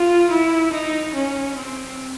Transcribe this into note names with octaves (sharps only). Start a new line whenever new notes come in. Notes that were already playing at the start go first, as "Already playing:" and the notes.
Already playing: F4
E4
D#4
C#4
C4